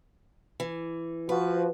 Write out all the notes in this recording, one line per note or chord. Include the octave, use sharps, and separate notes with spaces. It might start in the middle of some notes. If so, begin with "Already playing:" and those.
E3
F3 F#4 B4